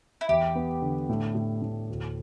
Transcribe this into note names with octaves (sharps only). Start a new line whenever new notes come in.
E4
E2 G4
B3
D3
A2
A2
A2
D2